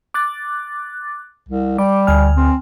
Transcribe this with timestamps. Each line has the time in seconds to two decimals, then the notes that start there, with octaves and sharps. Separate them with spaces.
0.14 D6 F#6 A6
1.49 C2
1.78 G3 D6
2.07 D2 G#5 F6
2.37 C4